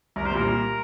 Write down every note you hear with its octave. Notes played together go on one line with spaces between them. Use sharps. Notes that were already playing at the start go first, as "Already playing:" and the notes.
C2 A#4
C5
A#2 G3 A#4